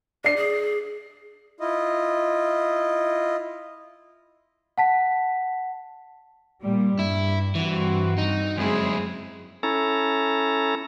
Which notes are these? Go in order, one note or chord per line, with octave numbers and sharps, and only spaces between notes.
D4 D5 C7
G#4
E4 F4 D#5
F#5 A5 B6
A#2 G3
G2 E4
G2 E3 C4 F#4
D#4
F#2 G#3 C4 E4 G#4
C#4 E4 A4 A#5